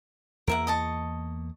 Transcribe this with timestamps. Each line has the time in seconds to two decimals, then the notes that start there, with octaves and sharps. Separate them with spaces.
0.47 E2 A#3 A#4 E5 F#5
0.67 D#5 A5 C#6